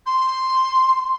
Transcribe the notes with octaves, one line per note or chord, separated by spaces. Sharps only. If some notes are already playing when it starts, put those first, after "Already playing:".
C6